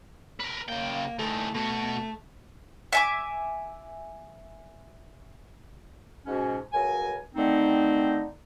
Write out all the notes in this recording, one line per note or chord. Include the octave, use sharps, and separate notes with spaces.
A#4 B4
C#3 A#3 G5
E3 A3 D#4
B2 A3 F#4
E5 G#5 D6
G#2 B2 C#4
C#2 F#3 A#4 G#5
D3 D#3 A3 C4 D#4